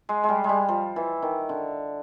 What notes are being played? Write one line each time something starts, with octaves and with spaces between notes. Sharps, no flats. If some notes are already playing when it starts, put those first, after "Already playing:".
G#3
G#3
G3
G3 G#3
F3
E3
D#3
D3